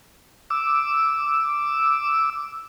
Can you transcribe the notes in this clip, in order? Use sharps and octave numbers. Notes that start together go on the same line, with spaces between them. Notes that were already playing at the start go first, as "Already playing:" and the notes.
D6 E6